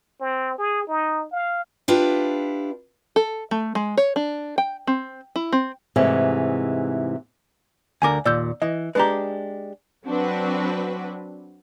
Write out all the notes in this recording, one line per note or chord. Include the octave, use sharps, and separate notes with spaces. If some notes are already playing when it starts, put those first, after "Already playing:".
C4
G#4
D#4
F5
D4 E4 F4 G4 B4
A4
A3
G#3
C#5
D4
G5
C4
E4
C4
G#2 C3 E3 G#3 A3
D2 D3 A#4 G#5 D6
D#2 A#2 D5 E6 G6
E3 D#5
G#3 D4 G4 B4 A#5
F#3 C4 D4 F#4 B4